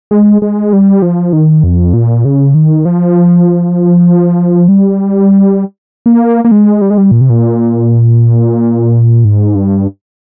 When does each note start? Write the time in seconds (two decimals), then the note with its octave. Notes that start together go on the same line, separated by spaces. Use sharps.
0.11 G#3
0.42 G#3
0.73 G3
1.02 F3
1.33 D#3
1.64 F2
1.94 A#2
2.25 C#3
2.54 D#3
2.85 F3
4.68 G3
6.06 A#3
6.45 A#3
6.51 G#3
6.81 G3
6.90 G#3
6.98 G3
7.11 A#2
7.21 C3
7.30 A#2
9.24 G#2
9.55 G2